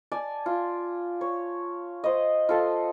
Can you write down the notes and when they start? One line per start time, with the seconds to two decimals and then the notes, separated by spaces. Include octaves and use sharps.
0.12 D5 G#5 A5
0.46 F4
1.21 C#5
2.04 C5 D#5
2.49 F4 A4 A5